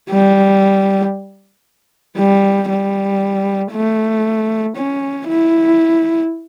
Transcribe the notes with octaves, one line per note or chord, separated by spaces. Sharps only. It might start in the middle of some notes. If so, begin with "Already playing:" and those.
G3
G3
G3
A3
C#4
E4